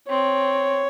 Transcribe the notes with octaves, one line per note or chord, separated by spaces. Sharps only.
C4 C#5